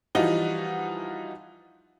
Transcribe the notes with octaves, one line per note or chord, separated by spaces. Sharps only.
E3 F3 G3 D#4 F4 F#4